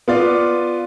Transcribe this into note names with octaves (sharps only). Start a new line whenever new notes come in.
B3 F4 D5